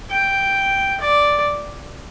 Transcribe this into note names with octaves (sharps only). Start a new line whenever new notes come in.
G5
D5